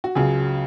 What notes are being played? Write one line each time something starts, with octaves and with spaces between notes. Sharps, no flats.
F#4
C#2 C#3 F#3 G#4